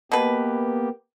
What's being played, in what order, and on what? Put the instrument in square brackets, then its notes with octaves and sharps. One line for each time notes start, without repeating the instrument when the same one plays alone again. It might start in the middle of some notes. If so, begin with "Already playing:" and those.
[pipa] B2 B4 [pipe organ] A#3 B3 G4